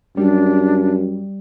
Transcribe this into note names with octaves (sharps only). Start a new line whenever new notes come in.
F#2 G3 D4